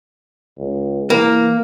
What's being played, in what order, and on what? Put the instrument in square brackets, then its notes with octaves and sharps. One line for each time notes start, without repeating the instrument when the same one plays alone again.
[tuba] C#2
[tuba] E3 [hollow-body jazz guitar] A#3